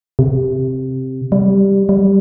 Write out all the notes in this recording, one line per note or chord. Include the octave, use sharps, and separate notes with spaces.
C3
G3
G3